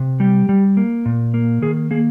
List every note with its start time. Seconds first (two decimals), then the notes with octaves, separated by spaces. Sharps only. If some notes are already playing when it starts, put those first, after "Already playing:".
Already playing: C3
0.20 G3 G4
0.49 G3
0.77 A#3
1.06 A#2
1.34 A#3
1.62 D#3 G#4
1.91 A#3 G#4